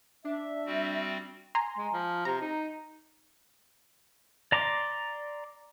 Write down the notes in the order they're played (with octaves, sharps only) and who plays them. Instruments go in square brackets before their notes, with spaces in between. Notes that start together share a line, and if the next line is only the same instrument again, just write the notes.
[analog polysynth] D4 [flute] E5
[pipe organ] G3 C4 F#4
[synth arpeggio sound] G#5 A#5 C6
[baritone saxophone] G#3
F3
[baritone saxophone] C3 [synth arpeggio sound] A#5
[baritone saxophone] D#4
[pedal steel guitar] D5 A#5 C6 D6